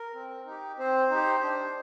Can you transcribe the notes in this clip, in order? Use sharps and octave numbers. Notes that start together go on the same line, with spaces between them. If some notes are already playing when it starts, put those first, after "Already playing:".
Already playing: A#4
C4
D#4 G4
C4 C5
D#4 G4
D4